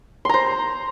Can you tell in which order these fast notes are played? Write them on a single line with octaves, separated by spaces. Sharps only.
C6 A#5 C5